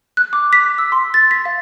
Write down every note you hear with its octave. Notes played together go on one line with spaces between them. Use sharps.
F#6
D6
B6
E6
C6
A6
B6
F5